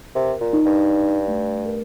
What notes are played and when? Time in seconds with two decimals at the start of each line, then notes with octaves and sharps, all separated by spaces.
0.15 C3 A#4
0.41 A#2
0.53 D#4
0.66 G2
0.90 D5
1.28 A3
1.66 A#4